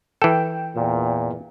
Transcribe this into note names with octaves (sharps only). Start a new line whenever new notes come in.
E3 A4 G5
E2 A#2